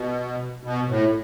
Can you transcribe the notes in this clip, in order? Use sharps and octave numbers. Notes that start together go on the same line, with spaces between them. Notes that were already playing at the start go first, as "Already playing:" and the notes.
Already playing: B2
B2
A2